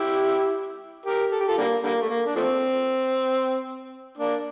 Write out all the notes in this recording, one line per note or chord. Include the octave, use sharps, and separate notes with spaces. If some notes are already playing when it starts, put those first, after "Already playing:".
Already playing: E4 G4
G4 A#4
A4
G4
F4 A4
D3 G3 A#3
D3 G3 A#3
A3
A#3
D4
F3 A3 C4
A#3 D4